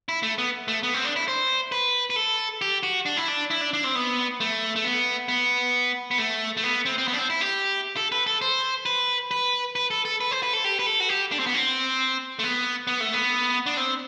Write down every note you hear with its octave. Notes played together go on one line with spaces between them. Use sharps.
E4
A3
B3
A3
B3
C4
D4
E4
C5
B4
B4
A4
G4
F#4
D4
E4
D4
E4
D4
D4
C4
B3
A3
A3
B3
B3
B3
A3
A3
B3
C4
C4
B3
D4
C4
E4
G4
A4
B4
A4
C5
B4
B4
B4
A4
A4
B4
C5
B4
A4
G4
B4
A4
F#4
G4
D4
C4
B3
C4
A3
B3
B3
A3
B3
D4
C4